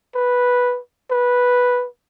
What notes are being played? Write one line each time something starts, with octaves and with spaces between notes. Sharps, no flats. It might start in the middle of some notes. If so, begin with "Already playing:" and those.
B4
B4